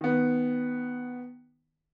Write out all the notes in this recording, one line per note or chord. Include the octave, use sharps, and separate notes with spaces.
D#3 B3